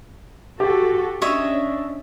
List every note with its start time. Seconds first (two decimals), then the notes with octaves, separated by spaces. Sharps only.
0.60 F#4 G4 A4
1.22 C#4 D4 C#5 D#5 E5